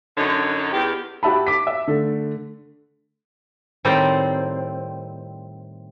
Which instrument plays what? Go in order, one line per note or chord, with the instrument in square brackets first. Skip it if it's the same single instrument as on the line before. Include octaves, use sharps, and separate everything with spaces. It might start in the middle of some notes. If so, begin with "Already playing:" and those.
[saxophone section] F#2 D3 D#4 C#5
E2 G4
[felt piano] F#4 G4 E5 A5 B5
D6 B6
E5
D3 A3 A4
[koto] A2 D#3 G3 C4 D5 A#5